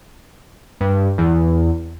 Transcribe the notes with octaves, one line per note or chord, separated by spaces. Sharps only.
G2
E2